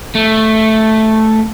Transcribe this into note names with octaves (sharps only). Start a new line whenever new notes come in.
A3